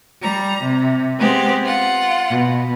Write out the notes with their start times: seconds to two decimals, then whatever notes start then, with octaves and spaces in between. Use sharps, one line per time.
0.21 G3 A#5
0.63 C3
1.19 G#3 B3 C4 G4
1.64 F4 F#5
2.29 B2